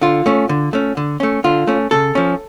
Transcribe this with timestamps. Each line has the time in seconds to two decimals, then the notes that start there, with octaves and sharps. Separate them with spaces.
0.01 D3 F4
0.26 A3 C#4
0.49 D3
0.73 A3 C#4
0.97 D3
1.20 A3 C#4
1.44 D3 F4
1.67 A3 C#4
1.91 C#3 A4
2.15 F3 C#4